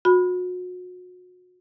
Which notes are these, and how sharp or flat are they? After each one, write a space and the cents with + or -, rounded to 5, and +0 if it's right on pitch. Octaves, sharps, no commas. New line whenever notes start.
F#4 -35 B5 +0